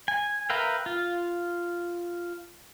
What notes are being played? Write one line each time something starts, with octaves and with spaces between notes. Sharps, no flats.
G#5
A#4 B4 E5 F5 G5
F4